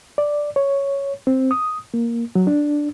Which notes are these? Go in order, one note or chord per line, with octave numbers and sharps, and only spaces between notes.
D5
C#5
C4
D#6
A#3
F#3
D4